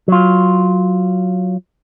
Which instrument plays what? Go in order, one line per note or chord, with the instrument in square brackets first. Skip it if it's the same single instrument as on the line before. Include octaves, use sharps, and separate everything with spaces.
[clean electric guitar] F#3 F4